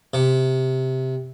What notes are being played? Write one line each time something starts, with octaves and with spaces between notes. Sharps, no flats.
C3